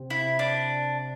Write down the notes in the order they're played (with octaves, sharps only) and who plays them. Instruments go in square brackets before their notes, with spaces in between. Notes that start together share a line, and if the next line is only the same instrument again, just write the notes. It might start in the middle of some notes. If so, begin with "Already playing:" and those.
Already playing: [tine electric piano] C3 C4
[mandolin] E4
D4